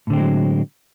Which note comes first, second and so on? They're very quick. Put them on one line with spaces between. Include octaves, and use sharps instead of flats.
A2 D3 C4 G#3 F#3